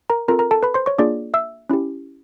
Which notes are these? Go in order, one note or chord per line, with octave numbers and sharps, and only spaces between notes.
A#4 A#5
C4 F4 A4 A#4 A#5
A#4 A#5
A4 A5
B4 B5
C5 C6
C#5 C#6
A#3 D4 F4 G#4 D5 D6
E5 E6
C#4 E4 G4